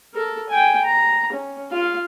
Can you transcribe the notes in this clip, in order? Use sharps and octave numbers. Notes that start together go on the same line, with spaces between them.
A4 A#4
G5 G#5
A#5
C#4
F4 F5